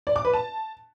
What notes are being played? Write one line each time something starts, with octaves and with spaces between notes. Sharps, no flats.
D5
D6
B4
A5